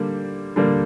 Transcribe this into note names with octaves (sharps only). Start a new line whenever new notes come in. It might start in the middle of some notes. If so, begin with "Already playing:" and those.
Already playing: D3 G3 A#3
D3 G3 A#3